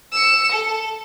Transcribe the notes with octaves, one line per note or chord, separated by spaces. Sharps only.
E6 C#7
A4